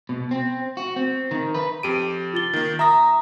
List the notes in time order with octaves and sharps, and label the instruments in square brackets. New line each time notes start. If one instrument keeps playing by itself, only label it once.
[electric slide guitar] B2
C4
F#4
C4
D#3
B4
[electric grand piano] F2 G4 D7 [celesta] D#7
[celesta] F4 A6 G7
[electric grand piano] D#3 A#3
[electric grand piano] E5 A#6 [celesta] A#5 D#6